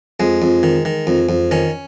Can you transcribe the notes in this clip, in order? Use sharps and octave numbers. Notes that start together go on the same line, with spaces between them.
F2 G#3
F2
D#3
D#3
F2
F2
D#3 C#4